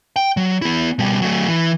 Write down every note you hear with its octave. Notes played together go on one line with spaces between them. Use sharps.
G5
F#3
B3 E4
B2 G3
F#3 A3
E3